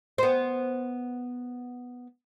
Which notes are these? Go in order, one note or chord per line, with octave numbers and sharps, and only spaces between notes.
B3 C5